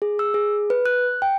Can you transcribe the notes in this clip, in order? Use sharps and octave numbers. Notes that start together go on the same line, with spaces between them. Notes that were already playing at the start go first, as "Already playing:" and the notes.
G#4
E6
G#4
B4
F#6
G5